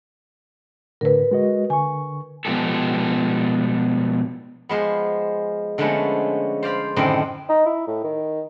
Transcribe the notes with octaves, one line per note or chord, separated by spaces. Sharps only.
A2 D3 A#4 B4
G#3 F#4 D#5
D3 G#5 C#6
B2 F3 G#3 G4 A4
F3 G#3 B3
D3 F3 G#3 A3 B3 C#4
C5 D5 F5 B5
F#2 A2 D3 D#3 C4 D4
D#4
E4
A2
D#3